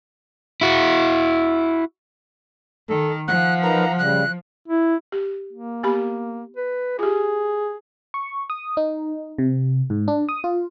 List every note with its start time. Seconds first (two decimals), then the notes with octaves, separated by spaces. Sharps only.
0.61 E4 F#4
2.89 D#3 A4
3.28 F3 F#5 F#6
3.63 D#4 A#4 B4 A#5
3.98 C#3 G3 F#6
4.68 E4
5.12 G4
5.53 A#3
5.83 B3 G4 B5
6.57 B4
6.99 F4 G4 G#4
8.14 C#6
8.50 D#6
8.77 D#4
9.38 C3
9.90 G#2
10.08 D4
10.29 D#6
10.44 F4